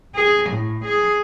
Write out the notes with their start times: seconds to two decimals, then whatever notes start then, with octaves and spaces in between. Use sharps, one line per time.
0.15 G#4
0.50 A2
0.85 G#4